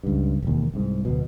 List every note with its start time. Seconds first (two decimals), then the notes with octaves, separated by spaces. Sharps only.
0.03 C#2 G2
0.42 E1 D#2
0.74 C2 G#2
1.05 D1 B2